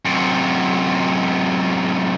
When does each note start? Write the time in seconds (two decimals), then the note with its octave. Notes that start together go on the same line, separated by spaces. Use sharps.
0.05 F#2 C3